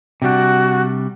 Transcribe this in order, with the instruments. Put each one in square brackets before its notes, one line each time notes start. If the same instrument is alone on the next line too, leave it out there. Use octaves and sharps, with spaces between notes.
[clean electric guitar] C3 G3 D4 [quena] F#4